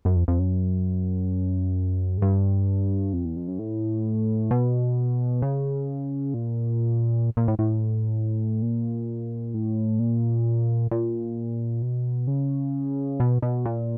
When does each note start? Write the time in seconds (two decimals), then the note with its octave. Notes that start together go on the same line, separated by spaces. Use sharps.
0.05 F#2
0.16 F2
0.28 F2
0.39 F#2
2.18 G#2
2.22 G2
3.13 F2
3.25 E2
3.36 F2
3.48 F#2
3.59 A2
4.51 B2
5.42 C#3
6.34 A#2
7.37 A#2
7.48 A2
7.59 A2
8.62 A#2
9.54 A2
9.99 A#2
10.91 A#2
11.82 B2
12.27 C#3
13.20 B2
13.42 B2
13.65 A#2